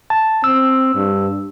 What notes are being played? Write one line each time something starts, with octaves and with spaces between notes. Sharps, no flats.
A5
C4 E6
G2